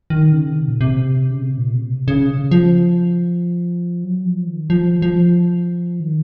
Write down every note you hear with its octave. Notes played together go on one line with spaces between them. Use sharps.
D#3
C#3
C3
A#2
C3
C#3
C3
A#2
C3
C#3
F3
F#3
F3
D#3
F3
F3
D#3